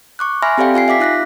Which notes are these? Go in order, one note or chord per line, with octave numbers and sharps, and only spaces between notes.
C#6 D6 F#6
E5 G#5 B5 C6 F6 A#6
C4 G4 A4 D5 F5 G5
F4 F5 G#5 C7
E5 F5 D6 B6
D#4 F4 F#6 A#6 B6